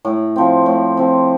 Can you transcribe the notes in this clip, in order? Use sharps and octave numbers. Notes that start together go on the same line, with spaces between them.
A2
F3 C4
A2
F3 C4